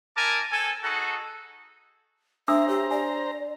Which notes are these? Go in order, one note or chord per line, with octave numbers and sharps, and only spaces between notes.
E4 A#4 G#5 A5 D6
C4 A4 G#5
D#4 F#4 G#4 A4
D4 C5 E5 A#5 D#6 E6
G4 C#5
D5 G#5